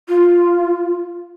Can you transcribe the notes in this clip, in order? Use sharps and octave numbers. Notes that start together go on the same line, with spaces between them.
F4